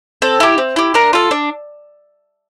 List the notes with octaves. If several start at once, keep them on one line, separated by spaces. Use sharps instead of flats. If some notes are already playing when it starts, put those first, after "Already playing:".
C4 A4
E4 G4
C4
E4 G4
D4 A#4
F4 A4
D4